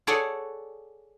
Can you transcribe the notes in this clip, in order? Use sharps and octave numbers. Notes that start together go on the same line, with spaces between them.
G#4 A4 C#5 D5 F#5 G#5